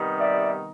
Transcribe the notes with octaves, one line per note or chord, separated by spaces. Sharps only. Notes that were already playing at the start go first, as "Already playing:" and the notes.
Already playing: C3 D#3 G3 B3 D#4
D5 E5